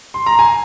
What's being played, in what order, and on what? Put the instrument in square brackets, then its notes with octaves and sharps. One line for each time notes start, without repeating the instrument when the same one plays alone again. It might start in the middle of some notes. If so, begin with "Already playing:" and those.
[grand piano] C6
A#5
G#5